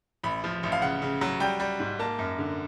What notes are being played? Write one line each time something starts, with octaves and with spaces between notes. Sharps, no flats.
A1 B5
F3
A1
F5
C#3 F#5
C#3
F#3
G3 G5
G3
G#2
A#3 A5
F#2
D3